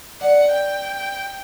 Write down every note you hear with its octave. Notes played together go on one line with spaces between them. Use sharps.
D5 F#5
G5